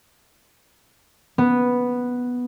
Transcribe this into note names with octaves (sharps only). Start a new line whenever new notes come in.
B3